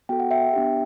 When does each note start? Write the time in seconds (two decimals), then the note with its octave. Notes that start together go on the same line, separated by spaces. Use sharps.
0.09 B3 F#4 A4 G5
0.20 F#5
0.31 E5 G5
0.53 B3 D4 G4